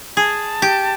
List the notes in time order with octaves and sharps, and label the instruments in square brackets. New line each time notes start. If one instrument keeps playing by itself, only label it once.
[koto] G#4 [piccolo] A5
[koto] G4